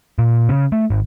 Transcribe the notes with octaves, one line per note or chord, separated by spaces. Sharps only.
A#2
C#3
A3
G#1